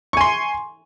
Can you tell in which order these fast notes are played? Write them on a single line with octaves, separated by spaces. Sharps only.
C#6 G#5 C6